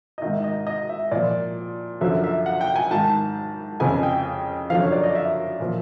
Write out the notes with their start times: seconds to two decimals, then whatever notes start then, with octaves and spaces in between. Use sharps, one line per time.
0.18 D#5
0.22 G#2 D#3 E5
0.44 D#5
0.67 D#5
0.89 E5
1.11 A#2 F3 D5
2.01 F#2 D3 F3 E5
2.24 E5
2.46 F#5
2.61 G5
2.76 G#5
2.91 G#2 D#3 A5
3.80 F2 C#3 F3 G#5
4.03 G5
4.70 F#2 D3 F3 F5
4.81 C#5
4.92 D5
5.03 D#5
5.15 E5
5.60 A#2 F3